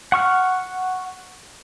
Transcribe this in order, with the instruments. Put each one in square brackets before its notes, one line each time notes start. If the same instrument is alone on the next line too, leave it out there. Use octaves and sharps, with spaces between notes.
[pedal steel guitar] F#5 C#6 F6